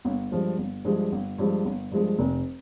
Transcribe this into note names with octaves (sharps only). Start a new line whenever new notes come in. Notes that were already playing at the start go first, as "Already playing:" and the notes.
G1
G2 F3 G#3
G1
G2 F3 G#3
G1
G2 F3 G#3
G1
G2 F3 G#3
F1